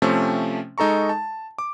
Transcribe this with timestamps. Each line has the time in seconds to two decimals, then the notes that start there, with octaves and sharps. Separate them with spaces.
0.02 C3 F3 A3 C4 C#4
0.78 G#3 D#4 A4 A#5 C#6
1.09 A5
1.58 D6